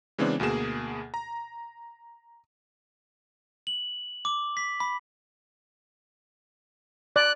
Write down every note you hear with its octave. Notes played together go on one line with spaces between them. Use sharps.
C#3 E3 G#3 B3 C4 D4
D2 B2 A#3 G#4 E7
A#5
F#7
D6
B6
B5
D5 F#6